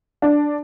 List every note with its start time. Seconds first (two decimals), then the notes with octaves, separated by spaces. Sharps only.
0.22 D4